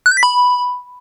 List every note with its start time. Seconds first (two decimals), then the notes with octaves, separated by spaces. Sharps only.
0.06 F#6
0.11 G6
0.17 B6
0.23 B5